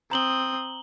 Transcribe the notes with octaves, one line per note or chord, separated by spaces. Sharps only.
C4 A#5 D#6 F#7 G7